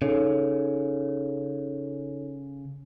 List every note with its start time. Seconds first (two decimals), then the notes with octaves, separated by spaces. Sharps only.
0.02 C#3 D#4 A4 C#5